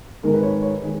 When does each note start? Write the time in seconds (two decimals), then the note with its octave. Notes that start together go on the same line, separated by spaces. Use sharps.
0.23 G#2 D#3 G#3 D#4 A#4
0.34 B4
0.43 C#5
0.62 C#5
0.83 D#3 G#3